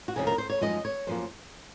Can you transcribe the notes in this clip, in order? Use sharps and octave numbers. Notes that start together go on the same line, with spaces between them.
F#4
D#2 C#3 F3 A#3 G#4
A#4
C5
C#5
F#2 F3 G#3 D#4 D#5
C#5
F#2 F3 A#3 C5